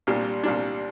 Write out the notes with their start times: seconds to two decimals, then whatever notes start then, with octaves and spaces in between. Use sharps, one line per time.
0.07 C2 A#2 G3 D4
0.43 C2 A#2 G3 D4